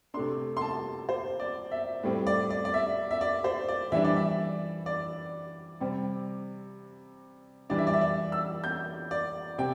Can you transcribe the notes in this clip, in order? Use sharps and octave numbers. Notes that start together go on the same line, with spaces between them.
C3 A3 D4 C6
C6
A5
C5
D5
E5
A2 G3 C4
D5
D5
D5
E5
E5
D5
C5
D5
E3 G3 D4 E5
D5
E5
D5
C3 G3 C4
E3 G3 D4 D5
E5
D5
E5
D5
E6
G6
D5
C3 G5